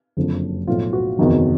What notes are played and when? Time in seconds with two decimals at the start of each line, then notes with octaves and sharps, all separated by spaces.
0.17 F#1 F2 D3 F3
0.67 B1 A2 F3 F4
0.93 F#4
1.18 F#1 E2 C3 D#3 F#3